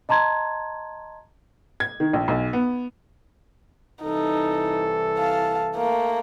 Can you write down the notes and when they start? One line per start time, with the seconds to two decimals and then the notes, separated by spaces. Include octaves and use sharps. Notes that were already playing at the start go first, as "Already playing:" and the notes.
0.09 D#5 A5 A#5 C6 G#6
1.80 G#6
2.00 D#3
2.13 A#1
2.28 B1
2.53 B3
4.03 C2 E3 D#4 A4
5.18 F5 A5
5.76 A3 A#3